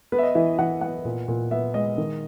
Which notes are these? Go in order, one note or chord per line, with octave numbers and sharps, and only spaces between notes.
B3 B4
E5
D#5
E3 E5
E3 F#5
B3 F#5
A#2
A#2
B3 E5
G#3 D#5
D#3